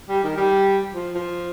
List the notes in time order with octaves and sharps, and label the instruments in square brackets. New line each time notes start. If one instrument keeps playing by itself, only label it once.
[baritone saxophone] G3
D#3
G3
F3
F3